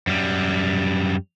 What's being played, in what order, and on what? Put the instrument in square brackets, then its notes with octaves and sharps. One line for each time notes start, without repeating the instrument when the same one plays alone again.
[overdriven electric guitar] F#2 G3